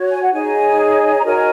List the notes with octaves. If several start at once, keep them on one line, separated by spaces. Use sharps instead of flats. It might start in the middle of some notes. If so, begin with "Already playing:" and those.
Already playing: F#4 C#5
G#5
F#5
D#4 G#4 C#5 D#5 G#5
A#5
F#4 A#4 C#5 D#5 G#5